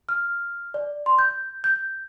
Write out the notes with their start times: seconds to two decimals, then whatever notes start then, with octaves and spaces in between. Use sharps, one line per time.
0.09 F6
0.74 D5
1.06 C6
1.19 G6
1.64 G6